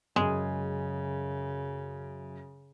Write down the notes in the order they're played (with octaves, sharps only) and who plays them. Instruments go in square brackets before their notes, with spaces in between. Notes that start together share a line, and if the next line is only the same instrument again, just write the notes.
[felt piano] F#2 [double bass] C#3 [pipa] G#3